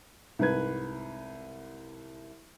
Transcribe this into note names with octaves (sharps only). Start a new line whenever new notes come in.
C2 G#2 B4 G#6